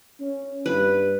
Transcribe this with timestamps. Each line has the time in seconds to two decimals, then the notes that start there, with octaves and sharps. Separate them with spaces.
0.20 C#4
0.66 G2 B4